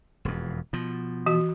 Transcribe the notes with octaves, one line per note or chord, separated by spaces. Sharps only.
E1 F2
B2 F3
E3 F#4